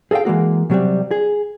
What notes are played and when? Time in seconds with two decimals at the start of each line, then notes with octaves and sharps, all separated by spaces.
0.11 G#4 A4 D#5 F5 G5
0.25 E3 G#3 A#3 F#4
0.70 C3 F#3 G3 C4
1.11 G#4